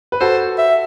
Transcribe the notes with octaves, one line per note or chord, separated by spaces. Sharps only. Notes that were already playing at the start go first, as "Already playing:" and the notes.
B4
F#4 A4 C5
E5